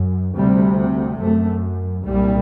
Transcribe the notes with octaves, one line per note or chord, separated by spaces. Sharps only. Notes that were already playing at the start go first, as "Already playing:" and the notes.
Already playing: F#2
D2 C3 G3
F#2 A3
C2 A#2 G3